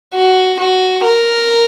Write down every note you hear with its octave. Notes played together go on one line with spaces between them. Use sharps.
F#4
F#4
A#4